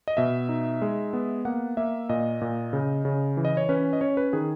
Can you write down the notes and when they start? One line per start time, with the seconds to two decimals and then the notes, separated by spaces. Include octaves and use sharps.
0.08 D#5
0.17 B2 E5
0.49 D#4
0.82 G#3
1.13 B3
1.45 A#3 F#5
1.77 A#3 E5
2.09 A#2 D#5
2.41 A#2
2.73 C#3
3.05 C#3
3.37 E3
3.45 D#5
3.57 C#5
3.69 C#4 B4
3.93 D#5
4.01 C#4 C#5
4.17 B4
4.33 D#3 G#4